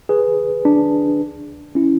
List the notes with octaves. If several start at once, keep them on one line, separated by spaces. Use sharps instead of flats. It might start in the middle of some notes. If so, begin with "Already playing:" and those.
G#4 B4
D4
C#4 E4